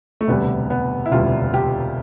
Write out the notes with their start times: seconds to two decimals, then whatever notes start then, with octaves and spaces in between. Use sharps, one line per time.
0.21 A3
0.28 E1 D2 C3 G3 B3
0.70 B3
1.06 E4
1.12 E1 D2 C3 G3 F4
1.54 G4